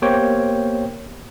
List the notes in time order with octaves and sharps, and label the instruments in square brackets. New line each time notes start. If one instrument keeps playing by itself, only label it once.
[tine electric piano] A#3 B3 G4 C5 C#5 G5